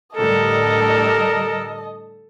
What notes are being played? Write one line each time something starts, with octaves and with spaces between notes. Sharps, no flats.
A2 D3 G3 A4 A#4 D#5 A5